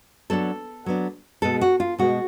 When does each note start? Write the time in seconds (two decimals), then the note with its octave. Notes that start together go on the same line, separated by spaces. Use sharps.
0.30 F#3 B3 D4 A4
0.86 F#3 B3 D4
1.42 B2 G#3 B3 A4
1.61 F#4
1.80 F4
1.98 B2 G#3 B3 F#4